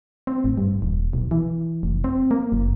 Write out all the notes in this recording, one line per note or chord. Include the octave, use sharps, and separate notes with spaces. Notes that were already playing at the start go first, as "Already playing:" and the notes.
C4
A1
G2
D#1
B1
E3
F1
C4
A#3
F#1